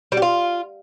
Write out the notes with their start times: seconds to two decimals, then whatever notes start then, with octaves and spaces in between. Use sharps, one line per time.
0.12 G3
0.17 G4
0.22 F4